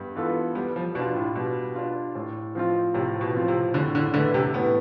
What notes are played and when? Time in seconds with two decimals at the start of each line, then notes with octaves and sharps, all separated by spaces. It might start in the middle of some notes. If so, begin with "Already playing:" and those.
Already playing: G2 B3
0.16 E3 B3 F4 A4
0.55 G3 B3
0.76 F3
0.95 B2 D4
1.00 F4
1.15 A2
1.35 B2 G3
1.75 D4 F4
2.15 A2
2.55 F3 C4 F4
2.94 A2 C3
3.21 B2
3.35 F3 C4 F4
3.48 C3
3.74 A2 D3
3.95 D3
4.14 D3 E3 A3 E4 B4
4.34 C3
4.54 A2 B3